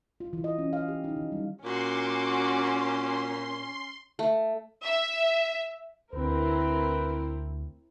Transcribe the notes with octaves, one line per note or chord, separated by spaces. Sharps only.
F4
E3
D#5
C#4
F5
G4
D#4
D#3
G3
A#2 C#4 F#4 C6 D6
A3
E5
D2 C4 E4 A#4 B4